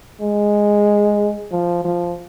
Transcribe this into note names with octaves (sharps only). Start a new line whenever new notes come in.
G#3
F3
F3